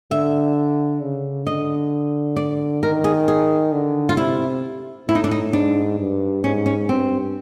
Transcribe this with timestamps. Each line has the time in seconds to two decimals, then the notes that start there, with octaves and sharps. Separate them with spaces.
0.11 D3 E5
1.01 C#3
1.47 D3 D#5
2.36 D5
2.82 D#3 A#4
3.04 G#4
3.28 G#4
3.72 D3
4.09 F4
4.17 C3 E4
5.08 A2 E4
5.15 D#4
5.24 D4
5.31 D#4
5.53 G#2 D4
5.99 G2
6.44 G#2 C#4
6.66 C#4
6.89 G2 C4